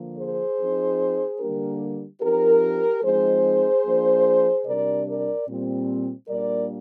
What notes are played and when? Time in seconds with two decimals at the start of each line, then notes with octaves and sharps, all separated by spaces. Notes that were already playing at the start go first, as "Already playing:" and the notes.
Already playing: D3 F3 A#3
0.17 G#4 C5
0.58 F3 C4 D#4
1.40 D3 G3 A#3 D4 G4 A#4
2.21 F3 C4 D#4 G4 A#4
3.03 F3 G#3 C4 D#4 G#4 C5
3.84 F3 A#3 D4
4.65 C3 G3 D4 A#4 D5
5.07 A#4 D5
5.47 A#2 G3 C4
6.28 A#2 G3 A#3 D4 A#4 D5